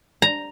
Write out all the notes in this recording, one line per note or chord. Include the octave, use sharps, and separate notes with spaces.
A#5